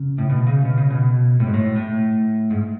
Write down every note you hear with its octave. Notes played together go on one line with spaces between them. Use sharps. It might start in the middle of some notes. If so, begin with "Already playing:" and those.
Already playing: C#3
A2
B2
C#3
B2
C#3
B2
A2
G#2
A2
A2
G#2